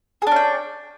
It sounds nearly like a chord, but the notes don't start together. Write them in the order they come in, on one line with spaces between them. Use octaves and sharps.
G#4 D4 C#4 G5